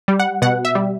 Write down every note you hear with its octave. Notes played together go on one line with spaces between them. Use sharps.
G3
F#5
B2 F#5
E5
G3